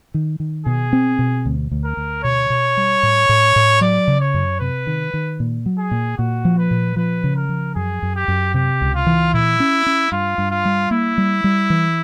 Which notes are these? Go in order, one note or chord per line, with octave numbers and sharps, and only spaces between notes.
D#3
D#3
B2 G#4
C4
B2
D2
D2
A#4
D2
B2 C#5
B2
G3
A2
A2
A2
F#3 D5
C#3
C#5
F#2
C3 B4
D#3
D#3
A#2
F#3
G#4
A#2
A#2 F#4
F3
B4
A#2
F3 B4
C#3
A#4
F3
F#2 G#4
F#2
G4
F#2
C3 G4
C#2
F4
E3
A#2 E4
C#4
C#4
G2 F4
G2
F4
G3
A#3 E4
G3
G3
E3